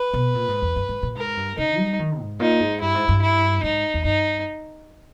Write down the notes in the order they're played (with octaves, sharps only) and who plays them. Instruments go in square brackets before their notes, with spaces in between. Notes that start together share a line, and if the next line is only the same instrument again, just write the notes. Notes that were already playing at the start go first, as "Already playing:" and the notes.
Already playing: [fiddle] B4
[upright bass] B2
A#2
G#2
E2
G2
G#2
A#2
[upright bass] G#2 [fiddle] A#4
[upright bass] G2
[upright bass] C#3 [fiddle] D#4
[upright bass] G3
D#3
G#2
[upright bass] A#2 [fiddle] D#4
[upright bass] G#2
[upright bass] G2 [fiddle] E4
[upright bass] G#2
G2
[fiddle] E4
[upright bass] G#2 [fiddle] D#4
[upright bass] E2
[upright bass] G2 [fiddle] D#4